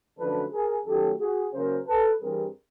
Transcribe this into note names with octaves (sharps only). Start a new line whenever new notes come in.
F#2 D3 F3 A3 A4 B4
G#4 A#4
F#2 D#3 F#3 A3 G4 A4
F#4 G#4
C#3 F#3 A#3 A#4 C5
A4 B4
G2 E3 G3 C4 G#4 A#4